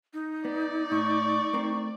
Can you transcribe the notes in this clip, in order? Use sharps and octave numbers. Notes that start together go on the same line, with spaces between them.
D#4
B3 D5
A2 C#6
A3 C4 A#4